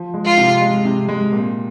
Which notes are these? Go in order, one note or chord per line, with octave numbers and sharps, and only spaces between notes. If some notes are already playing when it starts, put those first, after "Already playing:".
Already playing: F3
G#3
F4
C3
G#3
C3
G#3
A#2